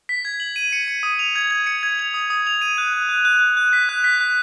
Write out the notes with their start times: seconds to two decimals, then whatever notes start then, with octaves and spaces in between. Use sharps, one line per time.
0.09 B6
0.25 G#6
0.40 F#7
0.56 D#7
0.73 C#7
0.88 C#7
1.03 D#6
1.19 F7
1.36 G#6
1.51 G#6
1.66 C#7
1.83 G#6
1.99 F7
2.14 D#6
2.30 D#6
2.47 F7
2.61 D#7
2.78 F#6
2.93 F#6
3.09 F#6
3.25 F#6
3.41 F#6
3.57 F#6
3.73 B6
3.89 F#6
4.04 B6
4.21 F#6